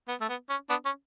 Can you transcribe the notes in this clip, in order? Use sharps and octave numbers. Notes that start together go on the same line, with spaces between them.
B3
A3
B3
C#4
B3 D4
C#4